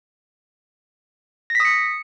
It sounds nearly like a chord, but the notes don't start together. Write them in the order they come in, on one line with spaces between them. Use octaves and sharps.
A#6 B6 D#6 C#7